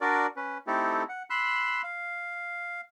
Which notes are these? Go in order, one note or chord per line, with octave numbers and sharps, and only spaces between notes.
D4 F#4 A#4 D5
C#4 B4
A3 C4 D#4 E4 G4 A4
F#5
B5 C6 E6 F#6
F5